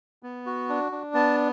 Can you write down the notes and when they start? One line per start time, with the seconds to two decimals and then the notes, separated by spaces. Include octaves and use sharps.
0.23 B3
0.46 F#4
0.69 D4
0.92 D4
1.14 B3 A5